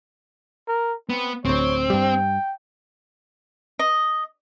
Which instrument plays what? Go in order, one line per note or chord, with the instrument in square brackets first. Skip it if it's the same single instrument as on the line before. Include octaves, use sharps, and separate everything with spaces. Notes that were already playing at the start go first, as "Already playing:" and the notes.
[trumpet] A#4
[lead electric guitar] B3 [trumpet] C4
[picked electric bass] D1 D2 [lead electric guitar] C4 [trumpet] C#5
[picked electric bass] G2 G3 [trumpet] G5
[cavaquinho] D#5